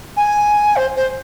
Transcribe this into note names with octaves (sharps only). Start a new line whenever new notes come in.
G#5
C5
C5